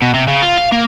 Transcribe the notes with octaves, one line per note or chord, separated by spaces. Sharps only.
B2
C3
C#3
F4
F5
A#3